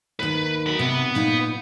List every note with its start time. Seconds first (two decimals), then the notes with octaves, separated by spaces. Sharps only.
0.20 D#2 D#3 B4
0.66 F#3 B5
0.79 C3 B3
1.15 A#2 D#4